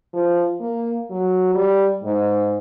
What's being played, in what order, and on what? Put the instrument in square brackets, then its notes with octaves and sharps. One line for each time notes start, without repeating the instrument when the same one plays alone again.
[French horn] F3
A#3
F#3
G3
G#2